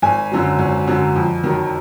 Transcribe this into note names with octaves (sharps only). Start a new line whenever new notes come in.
G#1 G#5
F#2 D3 F#3
G#1
F#2 D3 F#3
F2
D#3 F#3